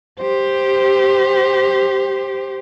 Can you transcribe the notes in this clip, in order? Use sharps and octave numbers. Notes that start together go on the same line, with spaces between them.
G4 C5